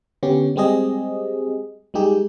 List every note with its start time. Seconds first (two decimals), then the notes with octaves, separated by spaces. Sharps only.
0.23 D3 B3 C#4 G4
0.56 G3 G#3 C4 G4 G#4 D#5
1.94 G3 G#3 D#4 G4 G#4